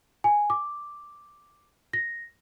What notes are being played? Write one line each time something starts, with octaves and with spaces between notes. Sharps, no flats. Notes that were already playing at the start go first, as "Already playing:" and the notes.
G#5
D6
A#6